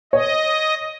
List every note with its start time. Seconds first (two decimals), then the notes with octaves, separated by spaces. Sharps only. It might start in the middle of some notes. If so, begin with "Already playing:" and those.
0.13 C#5 D#5